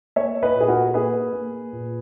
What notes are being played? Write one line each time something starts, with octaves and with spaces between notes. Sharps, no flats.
A#3 C#5 E5
B4 D#5
A#2
G#4
F#4 A#4
A#3 G#4 B4
A#3
A#2